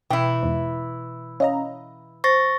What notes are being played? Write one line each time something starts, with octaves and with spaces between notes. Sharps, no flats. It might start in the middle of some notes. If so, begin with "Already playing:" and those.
B2 E3 E4 G5
E2 G#2
C#4 D#5 F5 A#5
C5 C#6 A6 A#6